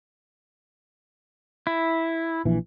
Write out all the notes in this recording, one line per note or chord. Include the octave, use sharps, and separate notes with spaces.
E4
A#1 E3